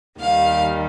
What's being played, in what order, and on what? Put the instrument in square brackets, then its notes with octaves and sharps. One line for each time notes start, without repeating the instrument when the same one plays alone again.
[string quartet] D#2 D#3 G3 F5